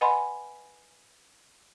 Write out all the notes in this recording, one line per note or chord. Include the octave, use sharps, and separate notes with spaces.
B4 D#5 F#5 G#5 B5 C6